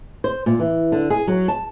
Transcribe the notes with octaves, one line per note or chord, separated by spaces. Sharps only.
C5
A#2
E3
D3
G#4
F#3
A5